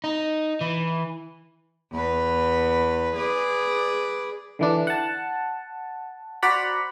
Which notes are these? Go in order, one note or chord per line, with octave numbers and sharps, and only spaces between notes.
D#4
E3
E2 B4
G#4 B4 D5
D3 E3 D4
F#5 A5
F#4 C5 D5 F#5 A#5 B5